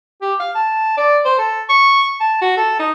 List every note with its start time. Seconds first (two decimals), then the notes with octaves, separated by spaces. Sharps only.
0.22 G4
0.40 F5
0.55 A5
0.97 D5
1.25 C5
1.38 A4
1.69 C#6
2.20 A5
2.42 F#4
2.57 A4
2.79 D#4